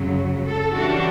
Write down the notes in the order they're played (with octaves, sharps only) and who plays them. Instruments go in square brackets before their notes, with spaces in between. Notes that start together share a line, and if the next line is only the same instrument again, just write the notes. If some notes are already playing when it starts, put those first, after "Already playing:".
Already playing: [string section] F#2 C#3 F#3
A4
C#3 E3 G3 D4 F#4